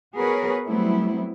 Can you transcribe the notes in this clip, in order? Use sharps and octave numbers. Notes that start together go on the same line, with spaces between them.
B3 F#4 G#4 A#4 B4 C#5
F#3 G3 A3 B3 C4 E4